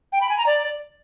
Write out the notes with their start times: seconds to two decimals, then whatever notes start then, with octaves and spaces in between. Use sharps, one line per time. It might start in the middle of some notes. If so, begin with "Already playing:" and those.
0.13 G5
0.21 B5
0.29 G#5
0.38 A#5
0.46 D5